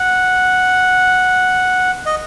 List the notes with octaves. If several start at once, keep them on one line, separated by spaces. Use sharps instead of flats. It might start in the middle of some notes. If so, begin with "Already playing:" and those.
Already playing: F#5
D#5